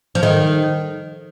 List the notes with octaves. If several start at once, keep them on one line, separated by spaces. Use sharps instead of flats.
F3
D#3